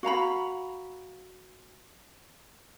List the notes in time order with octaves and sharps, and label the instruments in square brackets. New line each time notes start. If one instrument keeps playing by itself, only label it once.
[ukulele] F#4 F5 A#5 B5